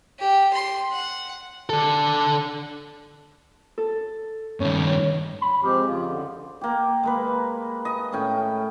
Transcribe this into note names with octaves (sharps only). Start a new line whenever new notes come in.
G4
C6
F#5
D3 A4
A4
G2 D#3 C#4
B5
F3 G#3 C4 G4
F2 C#3 F4
F#2 D3
A#3 G4
G#3 A#3 B4
D#5
A2 C#4 G5